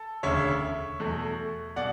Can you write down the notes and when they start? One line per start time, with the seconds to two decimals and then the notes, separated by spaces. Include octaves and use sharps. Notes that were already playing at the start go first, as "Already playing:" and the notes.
Already playing: A4
0.23 E1 D2 C#3 C#5 E5
1.00 E2 B2 A3
1.76 B2 D5 F#5